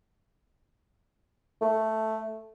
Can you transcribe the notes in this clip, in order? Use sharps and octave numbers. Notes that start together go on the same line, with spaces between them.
A3